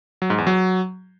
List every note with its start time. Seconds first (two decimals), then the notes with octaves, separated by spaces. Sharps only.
0.22 F#3
0.30 G#2
0.38 E2
0.47 F#3